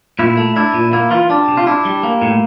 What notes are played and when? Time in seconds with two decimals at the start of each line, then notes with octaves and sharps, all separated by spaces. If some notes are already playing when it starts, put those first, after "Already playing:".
0.19 A#2 E4
0.37 A3
0.56 D4 E4
0.74 A#2
0.93 A#3 E4
1.11 E3 F4
1.29 G3 D4
1.48 C3
1.57 F4
1.66 D4 E4
1.85 G3
2.03 A#3
2.22 A2